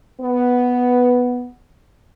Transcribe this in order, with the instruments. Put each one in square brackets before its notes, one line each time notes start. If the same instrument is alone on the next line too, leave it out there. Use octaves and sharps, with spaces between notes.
[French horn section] B3